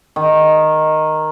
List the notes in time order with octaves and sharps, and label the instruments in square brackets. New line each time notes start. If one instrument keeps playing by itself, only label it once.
[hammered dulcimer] D#3